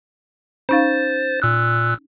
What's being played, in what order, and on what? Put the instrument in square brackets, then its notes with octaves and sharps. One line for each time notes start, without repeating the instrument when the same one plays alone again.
[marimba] C#4 D#4 F5 [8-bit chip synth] C5 A6
[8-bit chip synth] A#2 E6 F#6